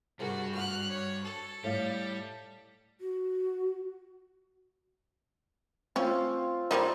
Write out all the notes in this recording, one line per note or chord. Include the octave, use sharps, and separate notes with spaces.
G2 C3 F#4 G#4 A#4
F#4 F#5 F6 F#6
C#5
A4
A2 G3 D5 F5
F#4
C4 C#4 F4
G3 A#3 D#4 C5 D#5